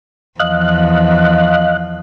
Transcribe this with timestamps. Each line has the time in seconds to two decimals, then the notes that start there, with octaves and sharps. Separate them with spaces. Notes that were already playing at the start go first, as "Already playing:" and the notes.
0.40 E2 F3 D#5 F5 F#6